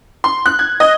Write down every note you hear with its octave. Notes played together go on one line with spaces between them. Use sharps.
C6
F#6
G#6
D#5